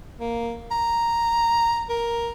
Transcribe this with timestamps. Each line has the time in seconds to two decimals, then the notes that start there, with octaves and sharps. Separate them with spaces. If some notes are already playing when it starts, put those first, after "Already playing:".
0.20 A#3
0.71 A#5
1.89 A#4